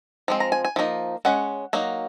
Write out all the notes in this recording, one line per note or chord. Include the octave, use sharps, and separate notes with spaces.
F3 G#3 C4
A#5
G#5
G#5
F3 A#3 D#4
G#3 C#4 F#5
F#3 A#3 D#4